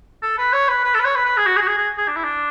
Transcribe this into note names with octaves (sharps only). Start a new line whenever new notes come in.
A4
B4
C#5
B4
B4
A4
B4
C#5
B4
B4
G#4
F#4
G#4
F#4
G#4
G#4
G#4
D4
E4
D4